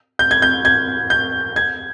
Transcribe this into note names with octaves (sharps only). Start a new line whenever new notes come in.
G6
G#6
G6
G#6
G6
G#6